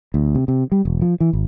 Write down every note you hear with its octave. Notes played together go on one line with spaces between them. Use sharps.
D2
C3
C3
G3
E1
F3
E3
G#1